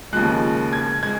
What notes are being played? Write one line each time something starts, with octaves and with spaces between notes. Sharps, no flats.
D#2 C#3 F3 G#3 F#6
G#6
G#3 G#6